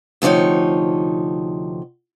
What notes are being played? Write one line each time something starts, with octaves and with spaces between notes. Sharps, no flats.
D2 C3 F3 D#4 C#5